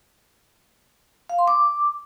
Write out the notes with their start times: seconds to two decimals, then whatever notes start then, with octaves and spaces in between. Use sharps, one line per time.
1.29 F5
1.39 C6
1.48 D6